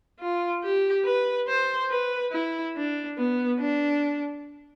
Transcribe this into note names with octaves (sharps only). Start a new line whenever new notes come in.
F4
G4
B4
C5
B4
E4
D4
B3
D4